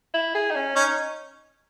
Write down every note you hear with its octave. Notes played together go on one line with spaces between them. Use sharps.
E4
G#4
D#4
C#4
C#4 D#4